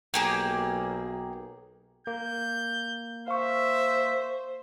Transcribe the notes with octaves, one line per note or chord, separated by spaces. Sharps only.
B1 A#3 G4 G#4
A#3 G6
C5 E5 F5 C#6